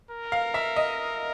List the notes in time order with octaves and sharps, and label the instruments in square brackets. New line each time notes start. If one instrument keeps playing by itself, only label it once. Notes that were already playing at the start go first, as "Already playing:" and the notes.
[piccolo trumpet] A#4
[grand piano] F5
E5
D#5